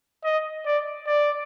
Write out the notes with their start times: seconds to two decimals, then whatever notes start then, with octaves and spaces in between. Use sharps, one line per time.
0.24 D#5
0.66 D5
1.07 D5